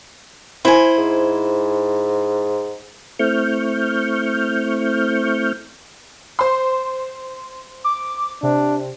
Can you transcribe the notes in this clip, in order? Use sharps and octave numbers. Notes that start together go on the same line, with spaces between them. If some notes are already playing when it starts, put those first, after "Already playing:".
E4 C5 G#5
G#2
A3 C4 E4 C#6 F6 G6
C5 C6
D6
C3 D4